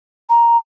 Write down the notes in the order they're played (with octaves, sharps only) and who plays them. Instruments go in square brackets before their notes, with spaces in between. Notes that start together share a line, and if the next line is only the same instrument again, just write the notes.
[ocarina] A#5